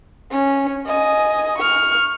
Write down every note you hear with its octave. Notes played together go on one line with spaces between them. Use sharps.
C#4
D#5 G#5
C#6 F6